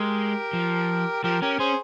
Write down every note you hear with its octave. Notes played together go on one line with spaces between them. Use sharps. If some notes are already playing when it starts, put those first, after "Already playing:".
Already playing: G#3 G4 A#4
F3
F3 G4 A#4
C#4 G4 A#4
C#4 G#4 C5